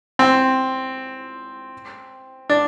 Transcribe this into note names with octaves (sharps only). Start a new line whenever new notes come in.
C4
D4